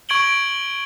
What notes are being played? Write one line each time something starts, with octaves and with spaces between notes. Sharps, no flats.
C#6 G#6 D7 F#7 G7